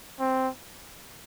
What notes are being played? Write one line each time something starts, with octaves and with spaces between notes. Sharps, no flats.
C4